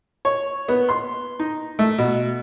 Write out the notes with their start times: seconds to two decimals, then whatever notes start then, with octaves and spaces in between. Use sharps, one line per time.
0.25 C#5
0.68 B3
0.89 C6
1.39 D#4
1.79 A3
1.98 B2